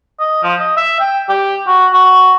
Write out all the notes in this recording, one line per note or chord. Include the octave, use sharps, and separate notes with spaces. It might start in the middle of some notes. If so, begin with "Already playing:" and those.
D#5
F3
D#5
E5
G5
G4
F#4
F#4